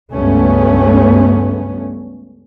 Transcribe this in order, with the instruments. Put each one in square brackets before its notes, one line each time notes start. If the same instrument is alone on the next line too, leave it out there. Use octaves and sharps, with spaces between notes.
[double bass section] C#2 G2 A3 B3 C#4